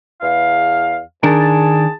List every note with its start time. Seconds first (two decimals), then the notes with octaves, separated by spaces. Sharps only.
0.21 E2 F5
1.23 D#3 D4 G#4 A#4 A5